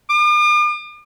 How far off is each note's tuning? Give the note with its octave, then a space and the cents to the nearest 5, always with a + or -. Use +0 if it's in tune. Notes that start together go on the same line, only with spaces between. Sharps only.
D6 +45